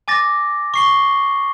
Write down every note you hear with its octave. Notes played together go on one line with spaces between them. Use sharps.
G#5 D6 A6 A#6
C#6 C7 G7